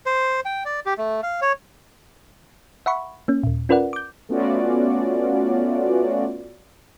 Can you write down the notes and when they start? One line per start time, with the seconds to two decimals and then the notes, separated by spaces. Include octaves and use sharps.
0.06 C5
0.45 G5
0.65 D5
0.86 G4
0.98 A3
1.23 F5
1.42 C#5
2.86 E5 F#5 B5 C#6
3.28 A#3 C#4
3.43 D#2 A#2
3.69 C#4 F4 A#4 B4 D5 F#5
3.93 D6 G6
4.29 A3 B3 C#4 F4 F#4 D5